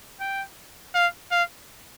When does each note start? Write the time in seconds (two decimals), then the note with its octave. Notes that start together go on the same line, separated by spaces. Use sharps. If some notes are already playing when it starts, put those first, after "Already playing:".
0.20 G5
0.95 F5
1.32 F5